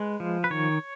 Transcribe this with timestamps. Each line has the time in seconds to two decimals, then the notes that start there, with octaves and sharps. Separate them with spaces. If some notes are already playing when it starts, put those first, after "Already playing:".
Already playing: G#3 B4
0.20 F3
0.44 B4
0.50 D#3 C#5